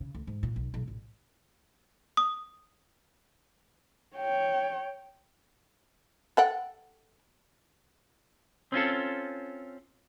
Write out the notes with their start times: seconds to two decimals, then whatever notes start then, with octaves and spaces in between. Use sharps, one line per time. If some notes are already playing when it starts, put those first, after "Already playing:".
0.01 C#3
0.15 D2
0.27 G#2
0.43 A#2
0.56 B1
0.74 B1
0.88 A1
2.17 D#6
4.16 C#5 G5
6.37 A4 F#5 G5
8.72 C4 C#4 F4 A4